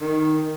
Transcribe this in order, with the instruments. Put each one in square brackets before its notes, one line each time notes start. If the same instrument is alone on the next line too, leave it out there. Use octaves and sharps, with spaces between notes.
[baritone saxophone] D#3